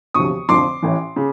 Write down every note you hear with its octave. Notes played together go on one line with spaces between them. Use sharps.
E1 D2 C3 F3 C#6 D#6
F1 F2 D3 F3 C6 D6
A1 A2 E3
C#3